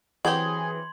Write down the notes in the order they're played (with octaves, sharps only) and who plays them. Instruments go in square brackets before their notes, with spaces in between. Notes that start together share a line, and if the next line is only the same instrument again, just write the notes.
[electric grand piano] E3 [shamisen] F#3 C4 G4 [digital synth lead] G#4 [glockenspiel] C6 G#6 F#7